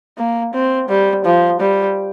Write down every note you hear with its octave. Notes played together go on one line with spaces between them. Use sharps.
A#3
C4
G3
F3
G3